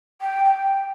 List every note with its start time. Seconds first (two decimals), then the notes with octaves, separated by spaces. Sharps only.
0.21 G5
0.45 G5